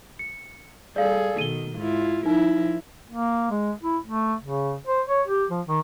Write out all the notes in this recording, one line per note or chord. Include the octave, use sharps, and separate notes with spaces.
C#7
G3 G#4 A4 D5 F5
B2 D#3 D#7 G7
G#2 E4 F4
F3 D#4 E4 A#4
A#3
G#3
E4
A3
C#3
C5
C#5
G4
F3
D#3